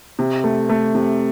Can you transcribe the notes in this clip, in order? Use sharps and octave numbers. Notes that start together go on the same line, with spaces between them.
C3
A3
A3
C3